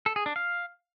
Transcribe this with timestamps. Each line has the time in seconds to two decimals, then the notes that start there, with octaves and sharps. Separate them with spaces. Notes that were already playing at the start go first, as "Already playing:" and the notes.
0.06 A4
0.16 G#4
0.26 D4
0.36 F5